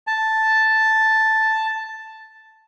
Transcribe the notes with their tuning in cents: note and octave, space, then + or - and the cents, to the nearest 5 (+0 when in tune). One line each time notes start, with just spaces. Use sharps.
A5 +0